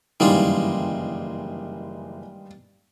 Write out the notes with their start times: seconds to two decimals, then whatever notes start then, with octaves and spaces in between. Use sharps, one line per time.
0.20 F#1 G2 D#3 E3 G3 G#3 F4